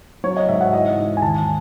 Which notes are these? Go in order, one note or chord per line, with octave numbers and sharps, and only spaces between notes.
F#3 C#5
D#5
G#2 E5
F#5
E3 D#5
G#2
G#5
D#2 A5